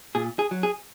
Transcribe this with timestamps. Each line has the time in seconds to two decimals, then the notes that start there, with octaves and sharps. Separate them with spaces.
0.15 A#2 G#4
0.39 G#4
0.51 F#3
0.63 G#4